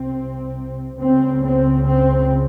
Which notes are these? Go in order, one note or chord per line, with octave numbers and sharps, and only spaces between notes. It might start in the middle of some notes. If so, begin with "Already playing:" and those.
Already playing: C2 C3 C4
C#2 C#3 C4
C4
C4